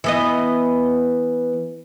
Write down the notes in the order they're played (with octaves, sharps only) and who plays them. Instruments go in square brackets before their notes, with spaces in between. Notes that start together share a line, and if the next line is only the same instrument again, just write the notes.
[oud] E3 B3 D#5